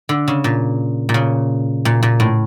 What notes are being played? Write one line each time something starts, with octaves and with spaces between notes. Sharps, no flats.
D3
C#3
A#2
A#2
C#3
A#2
A#2
A2